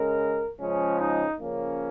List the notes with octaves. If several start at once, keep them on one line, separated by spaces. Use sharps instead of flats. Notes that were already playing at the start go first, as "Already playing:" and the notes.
Already playing: C#3 G#3 A#4
C#3 F3 G#3 C#4
D#4
C#3 F3 A#3 C#4